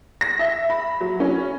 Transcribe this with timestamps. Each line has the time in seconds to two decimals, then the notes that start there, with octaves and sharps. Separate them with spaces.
0.21 A#6
0.39 E5
0.70 B5
1.01 F#3
1.20 C#4